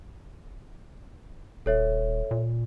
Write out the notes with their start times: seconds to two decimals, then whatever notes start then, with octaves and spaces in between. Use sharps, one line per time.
1.66 D#1 A4 C#5 E5
2.31 A#2